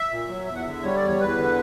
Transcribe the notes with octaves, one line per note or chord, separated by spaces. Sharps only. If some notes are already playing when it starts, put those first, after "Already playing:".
Already playing: E5
A#2
F#3
E2 E5
F#5
D3 E5
G3 C#5
D5
E2
C#5
E2 B4
D3